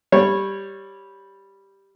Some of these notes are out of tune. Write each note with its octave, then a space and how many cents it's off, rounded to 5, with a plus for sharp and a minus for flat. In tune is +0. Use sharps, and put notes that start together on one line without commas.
G3 +0 C#5 -15